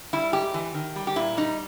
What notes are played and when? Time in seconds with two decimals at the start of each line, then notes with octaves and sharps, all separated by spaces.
0.13 G3 E4
0.33 G#2 G4
0.54 E3
0.74 D#3
0.96 G3
1.07 G4
1.16 A#2 E4
1.37 G3 D#4